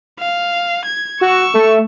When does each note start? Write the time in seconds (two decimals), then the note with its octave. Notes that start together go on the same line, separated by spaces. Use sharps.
0.19 F5
0.86 G#6
1.21 F#4 C#6 E6
1.54 A3